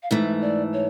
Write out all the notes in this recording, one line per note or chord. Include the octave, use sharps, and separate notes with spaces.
F5
G#2 E3 A3 E5
D5
C#5